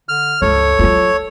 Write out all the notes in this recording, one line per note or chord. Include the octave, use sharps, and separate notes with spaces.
D3 F6
C#2 G2 A4 C#5
F#3 F4